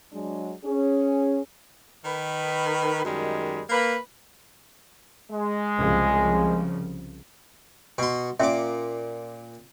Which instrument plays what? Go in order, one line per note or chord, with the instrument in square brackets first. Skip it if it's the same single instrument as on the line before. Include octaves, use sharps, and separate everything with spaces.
[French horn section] F#3 G#3 D4
C#4 G#4
[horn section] D#3 B4
F#2 D#3 G3 G#3
A#3 B4
[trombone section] G#3
[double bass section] C2 C#3 F3
[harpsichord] B2 C6
[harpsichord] A#2 D6 [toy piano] C#4 E5